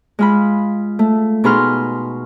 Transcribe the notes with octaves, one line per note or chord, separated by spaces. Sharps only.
G#3 F4 B5
A3
B2 D#4 G#4 B5 C6 F6